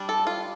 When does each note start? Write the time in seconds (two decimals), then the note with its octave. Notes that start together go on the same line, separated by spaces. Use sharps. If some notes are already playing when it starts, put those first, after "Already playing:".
Already playing: G3 D4
0.09 A4
0.27 F4